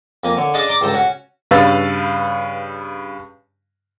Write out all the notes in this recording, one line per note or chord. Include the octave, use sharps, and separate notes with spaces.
F2 A#3 G#5
D3 C#5
C#4 D4 G#4 D#5 F5 A5
D5 A#5 C6 D6
C#2 G2 A4 C5 A#5
C#4 F#4 C#5
G2 C#3 B4 F5 E6 A6